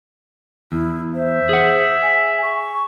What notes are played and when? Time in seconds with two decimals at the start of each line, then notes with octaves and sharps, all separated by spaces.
0.72 E2 E4
1.15 C5 E5
1.49 G#4 F#5
2.02 G#5
2.42 C#6